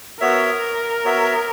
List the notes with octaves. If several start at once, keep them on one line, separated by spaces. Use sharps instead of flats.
B3 F#4 A#4 C#5 E5
B3 F#4 C#5 E5